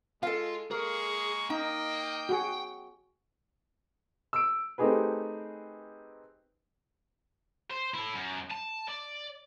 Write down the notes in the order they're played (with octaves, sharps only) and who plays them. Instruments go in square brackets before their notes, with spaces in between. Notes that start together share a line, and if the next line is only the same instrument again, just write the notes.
[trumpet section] G#3 [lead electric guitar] F4 [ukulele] A4 F5
[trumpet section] G#3 A#3 C#6 [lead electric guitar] G#4 [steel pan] A#4
[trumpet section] A#3 D#5 [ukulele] D#4 [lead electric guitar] G5
[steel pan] F#4 G#4
[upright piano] E6 D7
A3 C4 D#4 G4 G#4 B4
[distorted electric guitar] C5
E4 A4
F#2
A5
D5